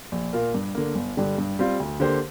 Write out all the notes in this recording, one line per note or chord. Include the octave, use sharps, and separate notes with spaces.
A#1
A#2 A#3 F4 A#4
G2
D3 A#3
G1
G2 D3 G3
G2
G3 C4 F4
D2
D3 A#3 G4 C5